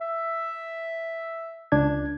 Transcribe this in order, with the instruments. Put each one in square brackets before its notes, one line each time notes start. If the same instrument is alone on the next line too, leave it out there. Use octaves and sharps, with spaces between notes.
[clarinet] E5
[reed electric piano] C#2 D4 G#6